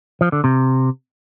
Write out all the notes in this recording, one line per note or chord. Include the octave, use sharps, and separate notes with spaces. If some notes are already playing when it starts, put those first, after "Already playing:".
F3
D3
C3